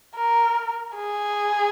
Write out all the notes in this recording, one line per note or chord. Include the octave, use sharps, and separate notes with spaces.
A#4
G#4